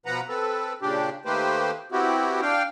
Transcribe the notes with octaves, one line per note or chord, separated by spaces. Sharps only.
B2 F3 B4 F#5 A#5
C4 A4 B4
A#2 C#3 D4 G4
D#3 A3 A#3 G4 B4 C5
B3 C4 E4 F#4 G4
D4 F5 G5